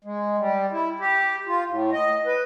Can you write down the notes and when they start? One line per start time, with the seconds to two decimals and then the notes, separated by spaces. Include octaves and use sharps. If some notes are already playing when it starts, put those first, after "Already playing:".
0.04 G#3
0.38 G3
0.72 E4
0.99 G4
1.47 F4
1.67 A2
1.92 D#5
2.26 B4